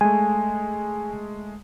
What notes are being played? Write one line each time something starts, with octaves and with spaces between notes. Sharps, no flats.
G#3 A3 G#5